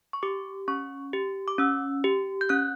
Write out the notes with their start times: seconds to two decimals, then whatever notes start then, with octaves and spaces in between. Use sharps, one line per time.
0.13 C#6
0.23 G4 D6
0.68 C#4 C#6
1.13 G4
1.48 D6
1.58 C#4 E6
2.04 G4
2.41 G6
2.49 C#4 F#6